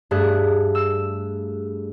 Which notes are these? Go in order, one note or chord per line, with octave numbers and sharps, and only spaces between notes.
G2 A3 G#4 F#6
E6